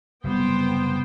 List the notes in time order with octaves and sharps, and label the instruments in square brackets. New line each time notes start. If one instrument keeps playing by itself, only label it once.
[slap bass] F#1 C3 G3 [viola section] B3 C5 G5